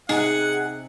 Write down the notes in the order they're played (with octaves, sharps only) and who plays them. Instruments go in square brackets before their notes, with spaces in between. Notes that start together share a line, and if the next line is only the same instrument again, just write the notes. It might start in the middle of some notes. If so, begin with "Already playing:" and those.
[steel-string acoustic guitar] C3 [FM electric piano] D#4 [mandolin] G#4 [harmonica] F#5